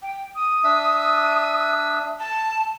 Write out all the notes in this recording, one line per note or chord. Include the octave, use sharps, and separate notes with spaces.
G5
D#6
D4 E5 E6
A5